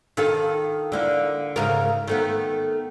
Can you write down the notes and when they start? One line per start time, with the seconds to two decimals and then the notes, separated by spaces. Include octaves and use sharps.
0.17 D#3 F4 A4
0.92 D3 A#3 E4
1.56 G#2 C#3 A#4
2.08 D#3 A3 B3